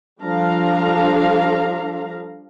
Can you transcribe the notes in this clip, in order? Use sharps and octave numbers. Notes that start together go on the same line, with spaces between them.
F3 G3 D4 A4 F5 A#5